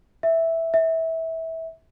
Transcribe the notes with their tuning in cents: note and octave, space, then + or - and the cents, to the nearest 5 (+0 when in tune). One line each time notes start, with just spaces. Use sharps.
E5 -5
E5 -20